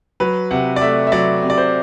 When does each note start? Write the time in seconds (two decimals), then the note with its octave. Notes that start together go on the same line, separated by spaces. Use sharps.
0.20 F#3 B4
0.51 C3 F#5
0.76 D5
0.81 A3 E5
1.07 E5
1.12 F#3 D5
1.43 C3
1.50 D5
1.58 C5